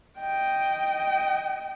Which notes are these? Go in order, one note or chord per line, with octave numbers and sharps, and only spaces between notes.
D#5 G5